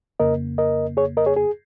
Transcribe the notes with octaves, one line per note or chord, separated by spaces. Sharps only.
F2 C#3 A#3 A#4 D#5
A#4 D#5
G#4 C#5
A#4 D#5
G#4 C#5
G#4